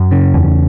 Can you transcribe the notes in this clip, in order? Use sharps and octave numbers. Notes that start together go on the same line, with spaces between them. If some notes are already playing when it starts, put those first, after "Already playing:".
Already playing: F#2
C#3
E2